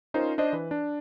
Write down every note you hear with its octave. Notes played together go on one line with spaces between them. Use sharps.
C#4 D#4 F4 A#4 C5
D4 C5 D#5
E3 B4
D4